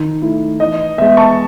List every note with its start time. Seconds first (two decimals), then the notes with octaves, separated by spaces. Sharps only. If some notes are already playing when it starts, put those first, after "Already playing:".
Already playing: D#3
0.22 A3 E4
0.60 E3 D#5
0.98 G#3 B3 E5
1.17 A5 C#6